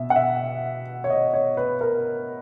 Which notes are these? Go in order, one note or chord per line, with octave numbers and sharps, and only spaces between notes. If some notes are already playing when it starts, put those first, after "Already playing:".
Already playing: B2 E5
F#5
E5
C#5
D#5
C#5
B4
A#4